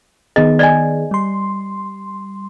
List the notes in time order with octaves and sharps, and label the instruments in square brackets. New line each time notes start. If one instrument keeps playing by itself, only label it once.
[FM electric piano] D#3 B3 G#4 [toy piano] D#5
[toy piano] D5 D#5 G#5
[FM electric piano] G3 C6